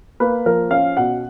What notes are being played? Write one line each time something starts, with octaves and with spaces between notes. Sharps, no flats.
A#3 B4
F3 A#4
C#4 F5
B2 F#5